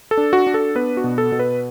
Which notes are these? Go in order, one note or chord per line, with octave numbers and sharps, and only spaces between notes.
A4
D4
F#4
D4
A4
B3 B4
F#4
B2
A4
B2
B4